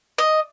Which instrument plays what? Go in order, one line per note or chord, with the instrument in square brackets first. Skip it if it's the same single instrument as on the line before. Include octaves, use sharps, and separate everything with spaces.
[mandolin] D#5